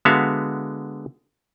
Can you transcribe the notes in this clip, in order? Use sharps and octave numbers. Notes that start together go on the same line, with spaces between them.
D3 G#3 B3 F#4 E5 F5